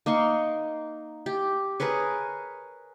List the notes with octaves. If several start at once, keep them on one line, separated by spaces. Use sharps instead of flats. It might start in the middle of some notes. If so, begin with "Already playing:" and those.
A#3 D#4 C6 C#6
G4
G#4 A#4 B4 C#5